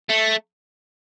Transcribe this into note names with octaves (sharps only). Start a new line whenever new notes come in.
A3